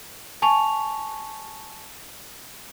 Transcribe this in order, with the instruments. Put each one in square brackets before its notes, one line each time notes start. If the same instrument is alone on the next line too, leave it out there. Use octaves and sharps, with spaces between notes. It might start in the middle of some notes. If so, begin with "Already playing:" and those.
[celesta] G#5 A5 C#6 F7